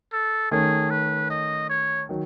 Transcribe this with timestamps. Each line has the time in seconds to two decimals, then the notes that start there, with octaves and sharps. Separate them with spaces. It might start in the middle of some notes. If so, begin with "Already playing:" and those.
0.12 A4
0.51 D#3 A3 C#4 G#4
0.90 B4
1.30 D#5
1.69 C#5
2.09 D#3 F#3